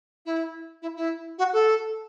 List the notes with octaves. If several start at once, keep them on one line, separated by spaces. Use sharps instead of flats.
E4
E4
E4
F#4
A4